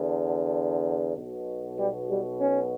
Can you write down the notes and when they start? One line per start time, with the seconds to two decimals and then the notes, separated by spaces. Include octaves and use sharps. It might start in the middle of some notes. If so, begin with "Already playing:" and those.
Already playing: E2 D3
1.15 B1 B2
1.78 G3
2.09 G3
2.41 C#4